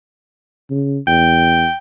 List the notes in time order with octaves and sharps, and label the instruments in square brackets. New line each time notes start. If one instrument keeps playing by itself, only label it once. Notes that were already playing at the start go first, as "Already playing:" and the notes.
[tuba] C#3
[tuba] E2 [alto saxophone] G5